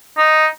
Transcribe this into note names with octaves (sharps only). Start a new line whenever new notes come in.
D#4